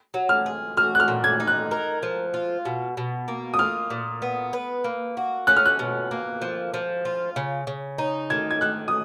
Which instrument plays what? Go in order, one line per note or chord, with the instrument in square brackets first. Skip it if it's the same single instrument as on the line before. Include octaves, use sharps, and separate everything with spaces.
[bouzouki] F#3
[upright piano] F6
[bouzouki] G#4
[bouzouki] F#4 [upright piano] F6
[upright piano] F#6
F6
[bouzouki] A#2
[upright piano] G#6
[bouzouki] D#4
[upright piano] F#6
[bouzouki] A#4
F3
F4
B2
B2
A#3
[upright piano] D#6
[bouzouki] F4 [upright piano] F6
[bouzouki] A#2
B3
B4
A#3
F#4
[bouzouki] C#4 [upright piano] F#6
[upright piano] F6
F#6
[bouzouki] B2
A#3
F3
F3
F4
C#3
C#3
D#4
[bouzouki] D#3 [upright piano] G#6
[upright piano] G#6
[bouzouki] D#3 [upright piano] F#6
[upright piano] D#6